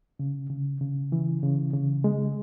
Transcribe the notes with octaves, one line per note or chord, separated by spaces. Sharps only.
C#3
C#3
C#3
E3
C#3
C#3
G#3